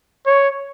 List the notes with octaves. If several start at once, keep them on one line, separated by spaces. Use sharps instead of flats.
C#5